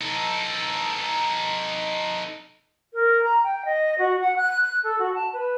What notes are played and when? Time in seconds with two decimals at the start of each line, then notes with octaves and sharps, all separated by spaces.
0.01 D#4 A4
2.94 A#4
3.23 A#5
3.43 G5
3.65 D#5
3.98 F#4
4.20 F#5
4.36 F#6
4.61 F#6
4.83 A4
4.99 F#4
5.14 A5
5.33 B4